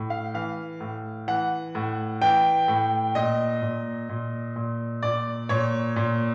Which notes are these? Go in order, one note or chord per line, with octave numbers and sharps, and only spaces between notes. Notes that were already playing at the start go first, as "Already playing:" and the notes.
Already playing: A2
F5
E3 F5
A2
E3 F#5
A2
E3 G5
A2
A#2 D#5
A#2
A#2
A#2
A#2 D5
A#2 C#5
A#2